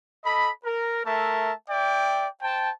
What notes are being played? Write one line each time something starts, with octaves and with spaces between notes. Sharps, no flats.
A4 D#5 B5
A#4
A3 A#4 E5 A5
D5 E5 G5
C5 G5 A5